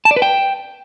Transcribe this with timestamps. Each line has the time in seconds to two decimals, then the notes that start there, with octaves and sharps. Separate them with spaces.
0.05 A5
0.11 D5
0.16 B4
0.22 G5